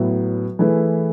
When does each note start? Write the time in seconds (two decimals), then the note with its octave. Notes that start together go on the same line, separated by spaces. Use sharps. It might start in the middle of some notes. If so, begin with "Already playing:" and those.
Already playing: A2 F#3 B3
0.59 E3 A3 E4 G#4 B4